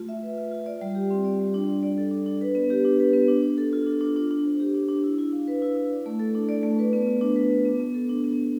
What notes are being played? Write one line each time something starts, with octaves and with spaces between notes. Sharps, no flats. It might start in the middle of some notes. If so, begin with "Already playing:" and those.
Already playing: A3 F4
E5
B4
F4
F4
D5
G3
G4
C4
D5
G3
D4
D4
D5
A4
D4
D4
B4
B3
G4
D4
B4
B3
D4
D4
A4
F4
D4
D4
D4
D4
C5
G4
D4
D4
E4
E4
F5
B4
E4
E4
D5
A3
A4
D4
D5
A3
B4
B3
F4
D4
B4
B3
B3
B3
A4
D4
B3
B3